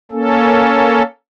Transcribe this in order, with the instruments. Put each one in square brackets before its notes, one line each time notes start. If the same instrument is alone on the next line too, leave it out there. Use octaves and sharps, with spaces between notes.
[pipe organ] A#3 C#4 A4